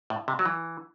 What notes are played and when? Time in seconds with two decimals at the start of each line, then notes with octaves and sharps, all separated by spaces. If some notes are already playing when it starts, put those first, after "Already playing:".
0.10 A2
0.28 C3
0.39 F#3
0.46 E3